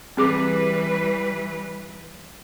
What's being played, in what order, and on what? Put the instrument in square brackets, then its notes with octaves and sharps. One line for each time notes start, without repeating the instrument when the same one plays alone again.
[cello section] E3 G3 B4 [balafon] C4 G#4 D6